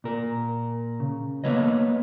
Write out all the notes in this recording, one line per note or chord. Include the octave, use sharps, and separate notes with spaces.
A#2 A#4
C#3
A#3 B3 B4 C#5 D#5